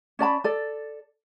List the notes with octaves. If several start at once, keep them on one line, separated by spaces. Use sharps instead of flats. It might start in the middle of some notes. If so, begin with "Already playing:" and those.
C#4 D5 A5 B5
A4 D5